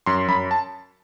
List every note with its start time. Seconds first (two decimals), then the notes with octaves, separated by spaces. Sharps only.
0.06 F#2 C6
0.28 F#2 B5
0.51 A5